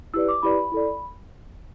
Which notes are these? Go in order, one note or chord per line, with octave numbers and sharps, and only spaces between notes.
E4 G4 B4 D5 E6
D6
E4 G4 B4 D5 B5
E4 A4 D5